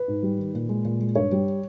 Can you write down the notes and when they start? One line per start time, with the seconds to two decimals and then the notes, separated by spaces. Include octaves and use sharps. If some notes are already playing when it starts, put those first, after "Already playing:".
Already playing: B4
0.08 G#2
0.23 G3
0.38 D#3
0.54 A#2
0.69 G#3
0.85 A#2
1.00 G#3
1.16 G2 C#5
1.32 G3